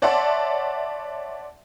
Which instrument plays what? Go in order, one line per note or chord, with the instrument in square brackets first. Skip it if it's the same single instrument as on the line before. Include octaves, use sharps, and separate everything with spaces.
[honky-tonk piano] C#5 D5 E5 F#5 A5 C6